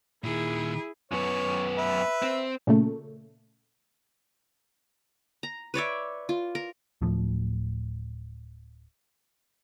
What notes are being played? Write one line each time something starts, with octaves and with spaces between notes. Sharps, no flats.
A#2 D#3 E4 G#4
F#2 B3 C#5
B4 E5
C4
A#2 C#3 A3
A#5
B4 C#5 D5 E5
F4
A#4
D1 A2 F3